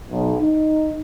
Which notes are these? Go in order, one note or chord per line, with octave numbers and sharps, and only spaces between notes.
B1
D#4